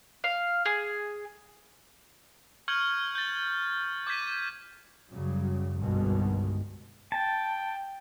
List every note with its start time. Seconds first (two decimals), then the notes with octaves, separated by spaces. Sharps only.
0.24 F5
0.66 G#4
2.68 C#6 F6 G6 G#6 C#7 F#7
3.15 G6 A6
4.07 D6 G6 G#6 B6 D#7
5.09 F#2 C#3 F#3 G3
5.78 G1 C2 G2 B2 D#3 G#3
7.12 G5 A5